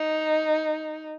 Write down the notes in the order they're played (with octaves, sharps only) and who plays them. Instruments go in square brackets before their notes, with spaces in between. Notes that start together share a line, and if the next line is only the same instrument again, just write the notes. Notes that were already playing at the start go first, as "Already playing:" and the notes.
Already playing: [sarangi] D#4